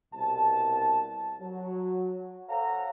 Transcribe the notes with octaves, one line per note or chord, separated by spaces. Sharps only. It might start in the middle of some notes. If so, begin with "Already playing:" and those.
C2 B2 A5
F#3
A4 C5 C#5 F5 F#5 A#5